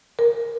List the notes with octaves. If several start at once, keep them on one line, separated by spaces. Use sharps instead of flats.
A#4